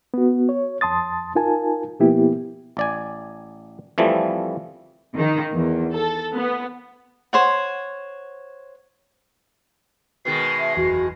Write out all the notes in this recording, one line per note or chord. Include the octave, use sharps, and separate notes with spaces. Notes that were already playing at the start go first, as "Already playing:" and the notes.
B3 F#4
C#5
F2 A5 C6 D#6 A6
D#4 F4 A#4 G#5 A5
B2 F3 A#3 B3 E4 G4
A1 D5 G#5
F2 E3 F3 G3 A3
D#3
E2
A4
B3
C5 C#5 F#5
B2 D#3 G#3 C7
E5
F#1 E2 F#4